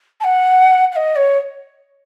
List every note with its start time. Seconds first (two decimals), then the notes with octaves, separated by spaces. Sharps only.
0.20 A5
0.24 F#5
0.92 F#5
0.96 D#5
1.16 C#5